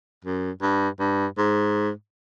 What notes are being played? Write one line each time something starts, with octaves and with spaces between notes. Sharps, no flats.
F#2
G2
G2
G#2